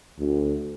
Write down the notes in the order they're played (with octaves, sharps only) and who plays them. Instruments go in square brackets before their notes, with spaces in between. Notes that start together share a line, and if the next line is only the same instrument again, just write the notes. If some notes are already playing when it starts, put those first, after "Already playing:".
[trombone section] D2